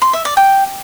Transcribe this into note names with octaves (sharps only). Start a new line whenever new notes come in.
C6
E5
D5
G5